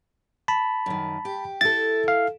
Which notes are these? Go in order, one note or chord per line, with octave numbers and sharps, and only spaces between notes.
A5 B5
F#2 D#3
G4
E4 A4 A6
F5